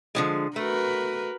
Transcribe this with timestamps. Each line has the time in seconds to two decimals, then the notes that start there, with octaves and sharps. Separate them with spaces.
0.15 D3 F3 G#3
0.56 A3 F#4 A#4 B4